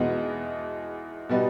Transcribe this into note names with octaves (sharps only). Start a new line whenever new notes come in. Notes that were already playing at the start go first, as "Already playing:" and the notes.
Already playing: E2 B2 G#3 B3 D#4
B2 G3 B3 D#4